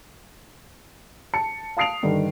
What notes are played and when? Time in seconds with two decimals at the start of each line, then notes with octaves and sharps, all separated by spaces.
1.34 A5 C#7
1.77 F5 A5 D#6 C7 D7 F7
2.03 G2 D3 D#3